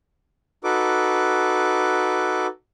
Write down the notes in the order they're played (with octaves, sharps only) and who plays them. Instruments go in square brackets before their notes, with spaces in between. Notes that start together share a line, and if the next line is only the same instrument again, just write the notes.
[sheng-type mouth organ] D#4 F#4 A4 B4 D6